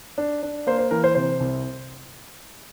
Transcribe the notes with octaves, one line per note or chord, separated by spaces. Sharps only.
D4
D4
A#3 C5
C5
E3 A#4
C5
C3 C5
C2